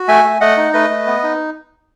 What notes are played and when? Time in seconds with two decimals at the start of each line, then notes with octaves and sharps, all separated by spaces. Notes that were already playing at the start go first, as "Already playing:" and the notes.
Already playing: F#4
0.08 A3 E5 G#5
0.24 A3
0.41 A3 D#5 F#5
0.57 D#4
0.73 A3 B4 D#5
0.90 A3
1.07 B3
1.23 D#4